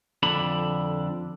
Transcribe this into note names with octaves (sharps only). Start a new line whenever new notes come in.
F2 D3 D4 B5